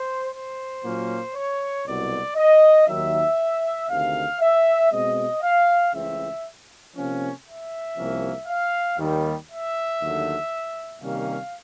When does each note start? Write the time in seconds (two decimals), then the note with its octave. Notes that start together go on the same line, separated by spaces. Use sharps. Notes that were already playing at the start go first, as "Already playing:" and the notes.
Already playing: C5
0.33 C5
0.83 A#2 F#3 A#3 C#4
1.35 C#5
1.85 C2 B2 F#3 D5
2.36 D#5
2.87 D#2 D#3 F#3 E5
3.89 D2 C3 D#3 F5
4.40 E5
4.91 B2 G#3 C4 D#5
5.41 F5
5.92 C#2 C#3 E3 A3 C4 E5
6.95 C3 F3 A#3 C#4
7.46 E5
7.96 C2 C3 F3 A#3 C#4
8.47 F5
8.98 D#2 D#3 G3
9.50 E5
10.00 D#2 D3 F#3 A3
11.02 C3 D#3 G3 A#3 C#4 F5